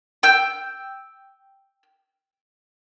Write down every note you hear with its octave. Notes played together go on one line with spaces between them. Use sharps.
G5 E6 G6